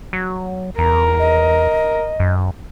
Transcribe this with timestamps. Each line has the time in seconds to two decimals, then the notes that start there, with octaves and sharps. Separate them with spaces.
0.13 F#3
0.78 E2 A#4 A#5
1.19 D#5
2.20 F#2